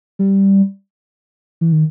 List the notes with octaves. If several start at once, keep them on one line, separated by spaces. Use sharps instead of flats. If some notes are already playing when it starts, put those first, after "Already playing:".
G3
E3
D#3